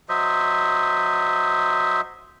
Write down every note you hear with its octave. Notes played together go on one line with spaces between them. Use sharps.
F#3 C5 D#5 E5